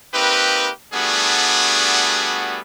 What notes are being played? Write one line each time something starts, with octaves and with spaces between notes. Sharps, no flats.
A#3 C4 D#4 G4 B4
G3 A3 B3 D4 F#4 G#4